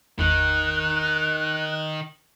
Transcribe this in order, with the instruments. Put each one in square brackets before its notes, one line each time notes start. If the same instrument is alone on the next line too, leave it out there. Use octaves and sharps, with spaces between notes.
[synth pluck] G#1 E2 [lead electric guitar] D#3 D#4 [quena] F#6